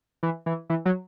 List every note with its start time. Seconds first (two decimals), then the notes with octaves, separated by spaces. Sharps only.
0.23 E3
0.46 E3
0.70 E3
0.85 F#3